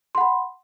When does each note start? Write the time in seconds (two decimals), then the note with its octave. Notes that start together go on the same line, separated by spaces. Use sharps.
0.15 C6
0.18 F#5
0.21 B5